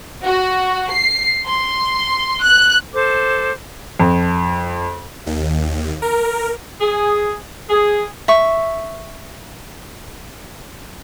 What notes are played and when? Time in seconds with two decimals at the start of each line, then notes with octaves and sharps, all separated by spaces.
0.25 F#4
0.91 C7
1.46 C6
2.42 F#6
2.94 A4 C5 D6
4.00 F2
5.26 D#2
6.02 A#4
6.81 G#4
7.70 G#4
8.28 E5 C#6